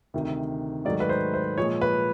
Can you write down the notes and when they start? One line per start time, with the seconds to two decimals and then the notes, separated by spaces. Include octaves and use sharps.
0.14 D2 C3 D#3
0.85 G#2 D#3 F#3 A3 D5
1.00 B4
1.09 C5
1.34 C5
1.58 A#2 F3 G#3 C#5
1.81 B4